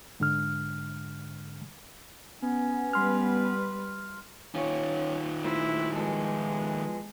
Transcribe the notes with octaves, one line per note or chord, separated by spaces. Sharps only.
G#2 D3 F6
B3 C#4
G3 B4 C6 F6
D#3 C#4 F4 C#5
A3 E4 C5
F3 G#3 B3 A4